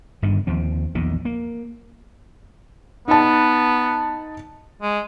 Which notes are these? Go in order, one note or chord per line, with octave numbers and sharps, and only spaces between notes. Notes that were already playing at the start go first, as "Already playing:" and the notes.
G1 G2 D3 D#3
D#2 F3 C4
A#1 E2 A#2 D#3
A#3
B3 D#4 A5
G#3